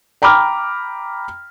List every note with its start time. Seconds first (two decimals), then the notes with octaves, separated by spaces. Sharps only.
0.22 G5 A#5 B5 D6 F6